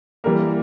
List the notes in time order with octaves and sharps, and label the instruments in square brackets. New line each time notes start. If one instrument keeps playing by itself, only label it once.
[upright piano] E3 G3 A#3 A#4